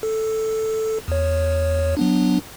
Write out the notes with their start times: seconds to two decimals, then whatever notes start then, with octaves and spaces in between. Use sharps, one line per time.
0.03 A4
1.08 E2 C#5
1.97 F#3 B3 D4